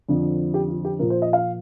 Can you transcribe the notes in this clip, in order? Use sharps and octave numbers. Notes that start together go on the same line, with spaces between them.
F2 D3 F3
G4
F4
G4
A#2 F3 A#4
C5
D#5
F5